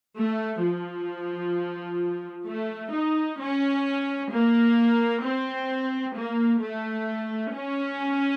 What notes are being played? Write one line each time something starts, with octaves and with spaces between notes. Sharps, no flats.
A3
F3
A3
D#4
C#4
A#3
C4
A#3
A3
C#4